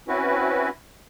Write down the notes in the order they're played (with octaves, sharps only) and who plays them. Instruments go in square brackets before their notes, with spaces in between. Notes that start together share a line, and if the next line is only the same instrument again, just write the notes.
[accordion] C4 C#4 E4 F#4 B4